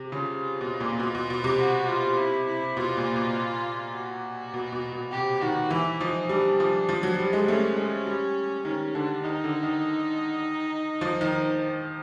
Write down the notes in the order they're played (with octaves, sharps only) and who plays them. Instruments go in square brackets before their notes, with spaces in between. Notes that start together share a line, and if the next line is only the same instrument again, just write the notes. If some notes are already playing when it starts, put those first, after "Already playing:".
Already playing: [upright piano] C3
[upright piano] C#3 [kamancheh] F4
[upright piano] B2
A#2
B2
B2
B2
C3
[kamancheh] F#4
F4
E4
E4
[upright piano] B2 [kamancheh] F4
[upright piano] A#2
A#2
[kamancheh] F#4
[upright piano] B2
B2
B2
[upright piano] C3 [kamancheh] G4
[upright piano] D#3 [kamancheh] F#4
[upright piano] E3 [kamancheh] E4
[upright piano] F3 [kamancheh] D#4
[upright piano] G3 [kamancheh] D4
[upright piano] F3
F3
F#3
G3
G#3
[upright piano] A3 [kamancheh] C#4
[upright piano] G#3
G3
[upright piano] D#3 [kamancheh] C#4
[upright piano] D3 [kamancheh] D4
[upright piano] D#3 [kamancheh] D#4
[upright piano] D3
D#3
F3
D#3